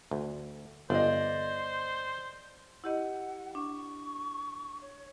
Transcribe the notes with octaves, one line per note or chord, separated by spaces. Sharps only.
D2
G1 C5 D5 D#5
E4 G4 D#5 F#5
D4 C#6
C#5